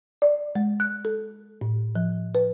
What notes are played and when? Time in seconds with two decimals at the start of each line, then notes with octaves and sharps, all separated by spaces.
0.22 D5
0.55 G#3
0.80 F#6
1.05 A4
1.61 A2
1.96 F3
2.35 B4